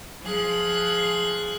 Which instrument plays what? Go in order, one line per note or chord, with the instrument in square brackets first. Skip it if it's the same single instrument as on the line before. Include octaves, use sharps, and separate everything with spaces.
[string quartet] F3 G#4 F#6